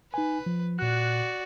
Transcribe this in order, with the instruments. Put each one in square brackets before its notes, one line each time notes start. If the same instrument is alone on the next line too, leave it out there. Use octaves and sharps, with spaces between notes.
[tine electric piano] D#4 G#5 [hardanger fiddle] B4
[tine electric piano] F3
[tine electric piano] A#2 F#6 [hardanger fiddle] F#4 D5